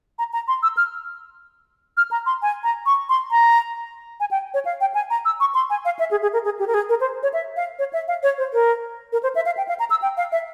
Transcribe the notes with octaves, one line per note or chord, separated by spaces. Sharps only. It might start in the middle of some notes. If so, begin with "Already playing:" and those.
A#5
A#5
C6
E6
F6
F6
A#5
C6
G#5
A#5
C#6
C6
A#5
G#5
G5
C#5
F5
G5
G#5
A#5
E6
C#6
C6
G#5
F5
E5
G#4
G#4
A#4
G#4
G4
A#4
G#4
A#4
C5
C#5
E5
F5
C#5
E5
F5
C#5
C5
A#4
A#4
C5
E5
F5
G5
F5
A#5
E6
G5
F5
E5